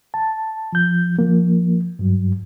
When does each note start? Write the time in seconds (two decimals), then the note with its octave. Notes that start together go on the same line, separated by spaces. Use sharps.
0.14 A5
0.73 F3 G6
1.19 F3 A#3
1.99 G2 F#3